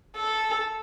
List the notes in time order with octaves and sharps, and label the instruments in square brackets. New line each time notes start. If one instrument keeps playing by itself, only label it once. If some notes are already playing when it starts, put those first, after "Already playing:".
[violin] A4